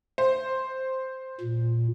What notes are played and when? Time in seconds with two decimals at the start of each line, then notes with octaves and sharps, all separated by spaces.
0.18 C5
1.41 A#2